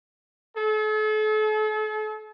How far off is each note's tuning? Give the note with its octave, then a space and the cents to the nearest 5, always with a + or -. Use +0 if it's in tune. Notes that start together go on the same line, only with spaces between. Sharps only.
A4 -40